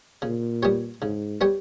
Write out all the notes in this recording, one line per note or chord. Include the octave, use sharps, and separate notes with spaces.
A#2 C#3
G3 B3 G4 C#5
G#2 C#3
G3 B3 G4 C#5